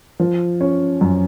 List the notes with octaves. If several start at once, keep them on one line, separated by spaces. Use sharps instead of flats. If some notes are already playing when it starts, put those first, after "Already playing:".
F3
C#4
F#2